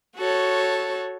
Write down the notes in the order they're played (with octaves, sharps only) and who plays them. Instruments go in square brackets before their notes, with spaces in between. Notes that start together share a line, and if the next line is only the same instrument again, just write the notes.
[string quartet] F#4 A4 C#5